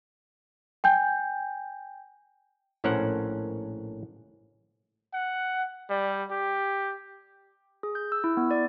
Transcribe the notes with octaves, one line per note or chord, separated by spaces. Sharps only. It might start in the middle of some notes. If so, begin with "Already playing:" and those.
G5 G#5 G6
A#1 A2 C#4 A#4 C5 F#5
F#5
G3
G4
G#4
G6
E6
E4
B3
D5